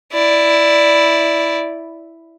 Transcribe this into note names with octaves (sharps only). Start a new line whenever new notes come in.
E4 D5